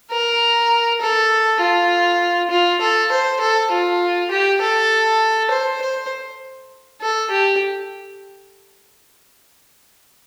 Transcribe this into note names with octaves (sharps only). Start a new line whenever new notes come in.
A#4
A4
F4
F4
A4
C5
A4
F4
G4
A4
C5
C5
A4
G4